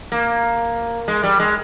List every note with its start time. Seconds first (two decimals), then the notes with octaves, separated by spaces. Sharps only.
0.12 A#3
1.08 G#3
1.23 G3
1.40 G#3